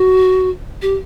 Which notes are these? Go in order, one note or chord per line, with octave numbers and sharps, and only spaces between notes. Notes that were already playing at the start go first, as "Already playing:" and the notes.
Already playing: F#4
G4